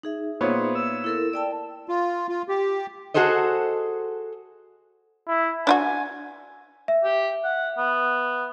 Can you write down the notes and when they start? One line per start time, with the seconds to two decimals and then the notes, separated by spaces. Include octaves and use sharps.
0.03 D#4 G#4 E5
0.41 A#2 B3 C5 C#5
0.75 E6
1.04 E4 A4 A#4
1.33 D5 G5 A5
1.89 F4
2.29 F4
2.49 G4
3.14 F#4 G#4 A4 C5 D#5
5.28 E4
5.67 D4 F4 F#4 G#5
6.88 E5
7.04 G4
7.44 F#5
7.78 B3